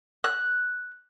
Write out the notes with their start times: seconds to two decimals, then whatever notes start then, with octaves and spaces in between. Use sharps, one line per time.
0.24 F#6